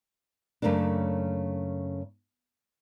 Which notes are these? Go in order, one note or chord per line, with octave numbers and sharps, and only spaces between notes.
F#2 C#3 A3 A#3 D4